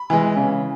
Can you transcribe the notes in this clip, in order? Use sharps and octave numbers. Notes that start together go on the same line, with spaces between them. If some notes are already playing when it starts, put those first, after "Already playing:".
Already playing: B5
E3 G#3
C#3